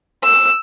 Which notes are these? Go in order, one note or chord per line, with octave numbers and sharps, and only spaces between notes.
E6